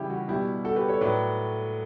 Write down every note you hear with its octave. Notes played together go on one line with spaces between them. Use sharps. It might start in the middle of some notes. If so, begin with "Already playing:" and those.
Already playing: C#3 E3 G3 E4 G4
F#4
B2 G3 E4 G4
F#4 A4
G4 B4
A4 C#5
A2 F#3 B4 D5